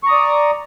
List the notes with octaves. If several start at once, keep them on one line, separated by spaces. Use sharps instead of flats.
D5 A#5 C#6 D#6